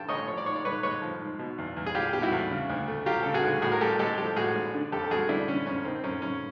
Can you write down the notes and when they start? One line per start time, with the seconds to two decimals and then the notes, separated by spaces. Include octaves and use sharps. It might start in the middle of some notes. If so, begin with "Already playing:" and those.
Already playing: G2 E3 G5 A5
0.09 A1 C#5 D#5
0.28 F3 C#5
0.38 D5
0.46 G#2 C#5
0.56 D5
0.65 G#2 B4 C#5
0.83 G#3 B4 C#5
1.02 F3
1.21 G#2
1.39 B2
1.58 E2
1.77 E2
1.86 G#4
1.95 G3 F4 G4
2.13 B2 G4
2.22 E4 F#4
2.32 E2
2.51 C#3
2.70 D2
2.88 A3
3.06 F#3 F4 G4
3.23 C#3 A4
3.34 F#4 G#4
3.44 D2
3.62 A2 F#4 G#4
3.72 A#4
3.81 A1 G4 A4
3.99 G#3 G4 A4
4.18 F3 G4 A4
4.36 A2 F#4 G#4
4.56 A1
4.74 D3
4.92 F2 G4 A4
5.04 A4
5.11 F2 F#4 G#4
5.29 G3 D4 E4
5.48 D3 C#4
5.66 F2 C#4
5.85 D#3 C4
5.95 C4
6.04 F#2 C#4
6.22 F#2 C#4